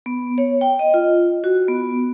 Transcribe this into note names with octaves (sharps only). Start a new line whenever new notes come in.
B3
C#5
G5
D#5
F4
F#4
B3